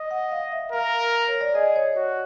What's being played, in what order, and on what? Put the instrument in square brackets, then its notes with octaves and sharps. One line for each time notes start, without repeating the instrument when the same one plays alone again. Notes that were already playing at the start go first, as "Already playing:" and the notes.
Already playing: [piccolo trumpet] D#5
[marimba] F#5
F5
E5
[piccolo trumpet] A#4 [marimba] F5
[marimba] C#5
D5
[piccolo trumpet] G#4 [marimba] D#5
[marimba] C#5
[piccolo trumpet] F#4 [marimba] C#5